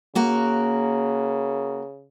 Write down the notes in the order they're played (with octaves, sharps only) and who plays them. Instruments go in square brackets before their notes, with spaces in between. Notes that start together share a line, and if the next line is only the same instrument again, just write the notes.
[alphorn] C#3 [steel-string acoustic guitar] A#3 F#4 A#4